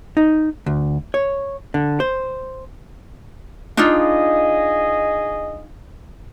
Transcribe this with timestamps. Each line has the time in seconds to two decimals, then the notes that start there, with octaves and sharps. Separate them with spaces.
0.17 D#4
0.66 D2
1.14 C#5
1.74 D3
2.00 C5
3.77 D4 D#4 F4 G#4 D#5